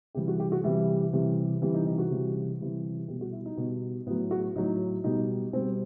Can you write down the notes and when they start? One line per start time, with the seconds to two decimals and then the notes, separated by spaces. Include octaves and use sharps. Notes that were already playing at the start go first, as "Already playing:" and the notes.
0.15 C3 E3 G3 G4
0.28 F#4
0.40 G4
0.52 F#4
0.64 C3 E3 G3 E4
1.13 C3 E3 G3
1.62 C3 E3 G3
1.74 D#4
1.86 D#4
1.98 F#4
2.10 C3 E3 G3
2.60 C3 E3 G3
3.08 B2 G3 G4
3.21 F#4
3.32 E4
3.45 D#4
3.57 B2 G3
4.07 A2 B3
4.10 F#3
4.31 F#4
4.56 A2 F#3 D#4
5.04 B2 G3 D#4
5.53 B2 G3 C4